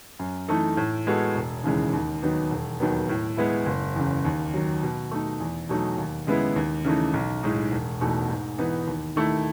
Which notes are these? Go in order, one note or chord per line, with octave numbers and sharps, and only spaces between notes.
F#2
E3 A3 D#4 A4
A2
G#3 B3 F#4 A4
E1
D#2 C#3 E3 G#3
D#2
D#3 F#3 B3 D#4
E1
D#2 D#3 F#3 B3
A2
G#3 B3 E4
F#1
E2 C#3
D#2
D#3 F#3
B2
A3 D#4
E2
B2 F#3 A3 D#4
D#2
C#3 G#3 B3 E4
D#2
C#3 E3 A3 D#4
B1
A2 G#3 D#4
E1
E2 B2 A3 D#4
G#2
E3 B3 D#4
D#2
D#3 A3 E4